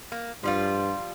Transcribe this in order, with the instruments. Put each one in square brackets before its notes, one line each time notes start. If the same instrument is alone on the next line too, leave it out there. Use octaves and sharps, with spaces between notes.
[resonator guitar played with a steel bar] A#3
[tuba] G2 [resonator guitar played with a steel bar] F3 G3 F4